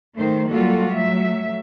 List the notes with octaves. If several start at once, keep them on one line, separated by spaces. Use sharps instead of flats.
D#3 A3 C5
F#3 G3 A#3 F4 F#4 A4
F#3 A3 E5